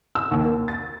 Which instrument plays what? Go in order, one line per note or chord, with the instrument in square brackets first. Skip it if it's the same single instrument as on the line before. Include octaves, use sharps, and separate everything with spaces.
[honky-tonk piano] E6
D#2
A#3
A6